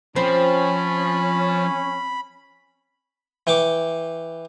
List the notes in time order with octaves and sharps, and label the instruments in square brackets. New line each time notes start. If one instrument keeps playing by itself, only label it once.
[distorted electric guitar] F3 [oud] C4 [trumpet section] C#4 [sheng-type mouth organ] B5
[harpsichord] E3 G5 C#6 D6